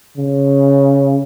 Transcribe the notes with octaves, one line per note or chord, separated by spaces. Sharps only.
C#3